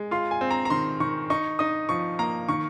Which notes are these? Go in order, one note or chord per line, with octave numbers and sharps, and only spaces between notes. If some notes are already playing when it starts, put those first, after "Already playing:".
Already playing: G#3
F4 C6
G#5
C4
A#5
A#5
D#3 C6
D#3 C#6
D#4 C#6
D#4 D#6
F3 C#6
A#3 A#5
D#3 C#6